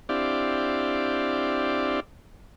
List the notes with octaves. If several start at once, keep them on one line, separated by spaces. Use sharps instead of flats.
C4 D4 E4 G4 D5 F5